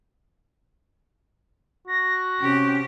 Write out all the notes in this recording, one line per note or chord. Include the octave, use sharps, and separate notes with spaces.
F#4 A#6
C3 C#4 G4